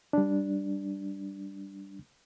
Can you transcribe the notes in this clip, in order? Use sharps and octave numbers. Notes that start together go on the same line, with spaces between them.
G3 D4